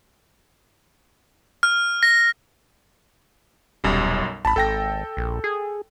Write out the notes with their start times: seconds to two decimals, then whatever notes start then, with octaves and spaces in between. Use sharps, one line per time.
1.63 F6
2.03 A#6
3.84 D#1 B1 F#2 G3
4.45 A1 A5 B5
4.56 G#1 A4 G5 A#6
5.17 A#1
5.44 G#4